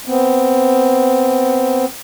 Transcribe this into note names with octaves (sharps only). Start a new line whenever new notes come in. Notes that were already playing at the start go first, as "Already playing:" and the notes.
B3 C4